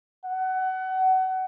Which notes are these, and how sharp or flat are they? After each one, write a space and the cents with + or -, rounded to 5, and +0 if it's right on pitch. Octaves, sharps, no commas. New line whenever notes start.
F#5 +25